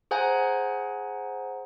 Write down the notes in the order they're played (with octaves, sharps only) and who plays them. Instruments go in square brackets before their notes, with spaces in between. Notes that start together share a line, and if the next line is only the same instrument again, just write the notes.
[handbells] G#4 C5 F#5 G#5 A#5